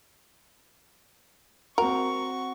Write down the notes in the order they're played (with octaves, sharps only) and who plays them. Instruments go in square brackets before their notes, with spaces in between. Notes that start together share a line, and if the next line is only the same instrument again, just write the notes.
[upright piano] C4 F#4 [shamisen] A#4 [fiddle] C#6